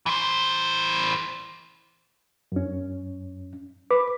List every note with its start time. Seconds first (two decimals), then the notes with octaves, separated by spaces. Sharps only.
0.06 E3 C5
2.52 F#2 C#4
3.91 B4 D6